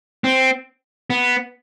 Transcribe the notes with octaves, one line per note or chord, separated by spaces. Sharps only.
C4
B3